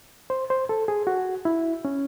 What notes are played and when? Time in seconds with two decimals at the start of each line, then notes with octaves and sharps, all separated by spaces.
0.30 C5
0.50 C5
0.69 A4
0.88 G#4
1.07 F#4
1.45 E4
1.85 C#4